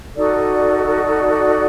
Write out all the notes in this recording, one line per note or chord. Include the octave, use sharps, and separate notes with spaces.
D#4 F#4 A4 D5